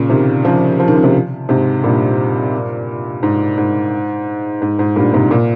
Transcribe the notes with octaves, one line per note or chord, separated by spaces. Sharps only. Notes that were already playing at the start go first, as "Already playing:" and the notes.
Already playing: A#2 C#3
C3 D#3
C#3 F3
F3
D#3
C#3
C3 D#3
G#2 C3
G2 A#2
G#2
G#2
G#2
G#2
G2 A#2
G#2 C3
A#2